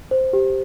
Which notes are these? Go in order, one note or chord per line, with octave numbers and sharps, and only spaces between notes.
C5
G4